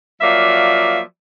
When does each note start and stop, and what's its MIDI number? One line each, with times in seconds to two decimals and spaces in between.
0.21 1.00 53
0.21 1.00 54
0.21 1.00 58
0.21 1.00 74
0.21 1.00 76